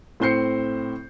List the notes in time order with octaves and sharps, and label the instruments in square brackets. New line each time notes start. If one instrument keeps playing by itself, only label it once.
[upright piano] A2 C4 C5 G6 C7 C#7